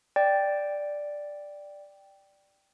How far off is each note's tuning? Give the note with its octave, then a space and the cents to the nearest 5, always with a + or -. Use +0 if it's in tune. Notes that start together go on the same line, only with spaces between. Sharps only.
D5 +0 G5 +0